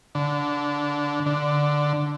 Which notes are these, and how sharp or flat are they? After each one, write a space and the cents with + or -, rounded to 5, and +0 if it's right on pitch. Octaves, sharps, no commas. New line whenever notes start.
D3 -15
D3 +0